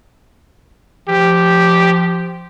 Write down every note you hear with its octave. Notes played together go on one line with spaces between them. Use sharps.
F3 G4